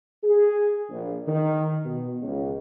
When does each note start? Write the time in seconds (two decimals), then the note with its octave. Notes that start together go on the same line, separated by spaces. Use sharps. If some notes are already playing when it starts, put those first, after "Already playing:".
0.24 G#4
0.90 A#1
1.27 D#3
1.85 B2
2.22 C#2